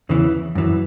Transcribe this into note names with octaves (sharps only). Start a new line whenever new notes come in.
E2 C#3 E3
F#2 E3